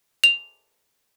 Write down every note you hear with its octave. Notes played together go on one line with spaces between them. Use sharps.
F7